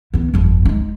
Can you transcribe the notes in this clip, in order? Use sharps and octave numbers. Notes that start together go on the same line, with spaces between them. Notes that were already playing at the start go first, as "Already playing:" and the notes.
E3 B3
G1 F2
G#3 D#4